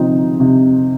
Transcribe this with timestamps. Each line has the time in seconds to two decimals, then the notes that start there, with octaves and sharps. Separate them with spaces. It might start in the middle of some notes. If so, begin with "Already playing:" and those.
Already playing: C3 F3 C4 D#4
0.40 C3